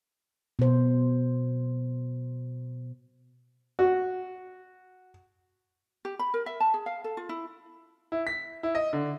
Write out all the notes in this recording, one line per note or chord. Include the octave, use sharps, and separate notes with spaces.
B2 C5
F#4
G4
B5
A#4
E5
A5
G#4
F5
A4
F4
E4
E4
B6
E4
D#5
D3